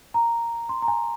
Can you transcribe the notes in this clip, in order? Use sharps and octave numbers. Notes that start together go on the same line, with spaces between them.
A#5
C6
A#5
G#5